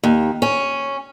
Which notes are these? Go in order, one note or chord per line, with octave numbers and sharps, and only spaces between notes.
D#2
C#4